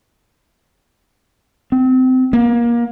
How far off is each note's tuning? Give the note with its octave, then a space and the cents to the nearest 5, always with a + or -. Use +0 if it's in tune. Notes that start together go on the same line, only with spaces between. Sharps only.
C4 -25
A#3 +25